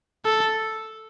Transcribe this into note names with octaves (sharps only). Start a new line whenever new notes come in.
A4